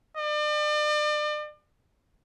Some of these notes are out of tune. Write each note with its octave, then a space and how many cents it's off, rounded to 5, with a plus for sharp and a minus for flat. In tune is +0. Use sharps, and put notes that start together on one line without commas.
D5 +40